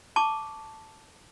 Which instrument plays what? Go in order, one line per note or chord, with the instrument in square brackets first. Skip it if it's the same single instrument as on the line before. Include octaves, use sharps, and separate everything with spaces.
[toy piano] A5 C#6 D6